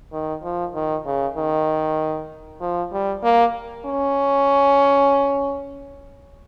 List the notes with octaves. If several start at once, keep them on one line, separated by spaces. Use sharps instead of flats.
D#3
F3
D#3
C#3
D#3
F3
G3
A#3
C#4